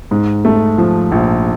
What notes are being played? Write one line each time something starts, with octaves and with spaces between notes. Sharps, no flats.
G#2
A3
F3
A#1